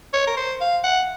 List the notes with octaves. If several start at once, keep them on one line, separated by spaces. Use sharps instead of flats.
C#5
A#4
C5
F5
F#5